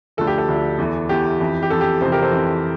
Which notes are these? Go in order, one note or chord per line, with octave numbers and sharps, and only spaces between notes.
D2 D3 F3 A4
G4
A4
D2 D3 F3
E2 E3
E2 E3 G4
F2 E3
G4
F2 E3 A4
G4
F2 C3 E3 A4 C5
G4 A#4
A4 C5
F2 C3 E3